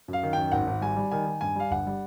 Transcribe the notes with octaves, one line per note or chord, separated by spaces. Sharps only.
F#2
F5
D#3
F#2 G5
G#1 F#5
G#1
G3 G#5
G3
D#3 G#5
D#3
G2 G#5
G3 F5
G1 F#5
G3